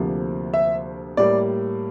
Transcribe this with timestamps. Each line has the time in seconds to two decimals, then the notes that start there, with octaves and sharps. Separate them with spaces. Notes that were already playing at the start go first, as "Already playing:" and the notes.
Already playing: D2 C3 F3 A#3
0.54 E5
1.17 A2 G3 A#3 D5